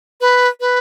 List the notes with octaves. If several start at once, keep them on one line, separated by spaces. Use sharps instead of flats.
B4
B4